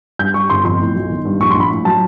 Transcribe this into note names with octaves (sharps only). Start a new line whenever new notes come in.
G2 G6
G3 C#6
G1 C6
F2 C6
A2
B1
D#3
G2
A#1 C#6
C6
A#1
B5
A2
F#3 A5